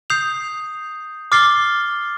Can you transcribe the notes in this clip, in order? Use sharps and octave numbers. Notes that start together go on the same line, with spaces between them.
D#6 G6 C7 F7
D6 F6 A6 C7 G7